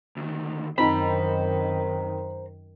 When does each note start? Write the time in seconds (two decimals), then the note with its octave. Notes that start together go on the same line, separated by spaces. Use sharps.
0.17 D2 D#3
0.78 F#2 D#3 C4 D#4 C5 A#5 B5